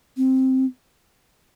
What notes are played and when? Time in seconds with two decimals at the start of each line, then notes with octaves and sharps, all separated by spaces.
0.17 C4